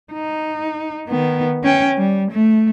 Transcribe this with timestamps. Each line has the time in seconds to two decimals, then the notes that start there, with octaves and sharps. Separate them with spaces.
0.13 D#4
1.08 D#3 B3
1.63 C#4 G5
1.98 G3
2.31 A3